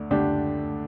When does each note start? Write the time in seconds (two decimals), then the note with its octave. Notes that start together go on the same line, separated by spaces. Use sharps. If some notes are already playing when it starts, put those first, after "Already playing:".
Already playing: D2 D3 A3 D4
0.11 D2 D3 A3 D4 G4